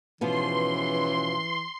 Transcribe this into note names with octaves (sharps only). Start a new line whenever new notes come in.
G#2 B2 E3 F3 B3 C#4 C6